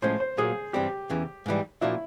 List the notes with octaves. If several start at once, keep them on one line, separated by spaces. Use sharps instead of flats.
A2 F3 G#3 C#4 C5
C5
A#2 F#3 A#3 G#4
G2 E3 G3 C4 G4
E2 C#3 E3
G#2 E3 G3
A#2 F3 A#3 D4 E4 F#4